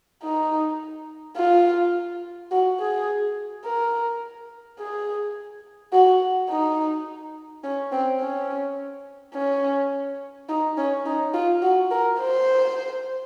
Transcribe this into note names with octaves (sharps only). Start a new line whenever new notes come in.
D#4
F4
F#4
G#4
A#4
G#4
F#4
D#4
C#4
C4
C#4
C#4
D#4
C#4
D#4
F4
F#4
A#4
C5